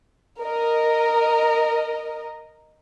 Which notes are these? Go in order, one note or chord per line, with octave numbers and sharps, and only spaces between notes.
A#4 D#5